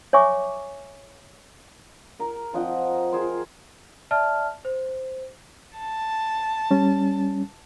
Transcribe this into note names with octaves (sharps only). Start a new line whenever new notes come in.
C#5 E5 G#5 C#6 D6
A#4
F3 C4 D#5 F#5
G#4 A#4 C5
D5 E5 A5 F6
C5
A5
G3 C#4